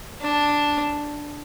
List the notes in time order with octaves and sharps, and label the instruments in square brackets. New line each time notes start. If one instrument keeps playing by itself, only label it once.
[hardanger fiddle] D4